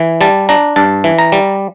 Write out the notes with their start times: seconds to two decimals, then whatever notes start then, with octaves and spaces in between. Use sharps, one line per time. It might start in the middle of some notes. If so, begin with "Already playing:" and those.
Already playing: E3
0.21 G3 A5
0.49 D4 A#5
0.76 G2 A5
1.04 E3
1.18 A#5
1.32 G3